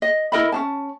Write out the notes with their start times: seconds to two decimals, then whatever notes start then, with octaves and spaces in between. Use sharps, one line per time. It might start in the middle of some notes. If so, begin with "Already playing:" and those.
0.02 D#5
0.32 E4 A#4 D#5 B5
0.52 C#4 D4 A5